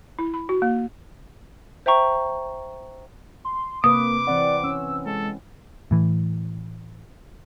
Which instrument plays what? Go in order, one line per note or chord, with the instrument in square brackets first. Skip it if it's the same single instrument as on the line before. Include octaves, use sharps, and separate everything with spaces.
[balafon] E4
B5
F#4
A#3
[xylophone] C5 E5 G5 A#5 C#6
[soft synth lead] C6
[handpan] C3 B4 [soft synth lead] A#3 [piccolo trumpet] D6 [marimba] D#6
[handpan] E3 C4 F#5 [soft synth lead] D5
[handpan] C#4 [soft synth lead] E6
[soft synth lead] G#3 [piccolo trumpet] A4
[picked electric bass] A2 E3